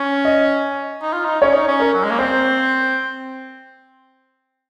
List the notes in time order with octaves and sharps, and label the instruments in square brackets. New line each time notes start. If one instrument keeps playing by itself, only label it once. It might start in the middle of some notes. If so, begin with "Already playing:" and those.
Already playing: [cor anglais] C#4
[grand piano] D#5
[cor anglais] D#4
F4
D#4
[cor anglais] C#4 [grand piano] C#5
[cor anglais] D#4
C#4
[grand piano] A#4
[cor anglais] F#3
G#3
A#3
[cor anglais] C4 [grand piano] C5